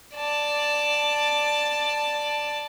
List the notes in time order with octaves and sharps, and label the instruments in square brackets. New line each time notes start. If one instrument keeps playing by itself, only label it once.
[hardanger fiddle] D5 A5